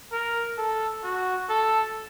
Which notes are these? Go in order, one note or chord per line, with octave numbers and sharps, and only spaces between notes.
A#4
A4
F#4
A4